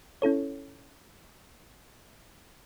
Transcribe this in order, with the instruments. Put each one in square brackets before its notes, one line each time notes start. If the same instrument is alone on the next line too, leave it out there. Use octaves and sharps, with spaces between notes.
[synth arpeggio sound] C#4 E4 A4 C#5